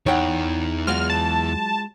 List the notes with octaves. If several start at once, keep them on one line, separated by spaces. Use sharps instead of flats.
E2 D#4 C#5 F#5 G5
F#3 G#3 F4 F#4 F6
A5